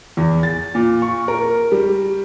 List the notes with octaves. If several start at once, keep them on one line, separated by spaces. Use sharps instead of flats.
E2
A6
A#2
C#6
A#4
G3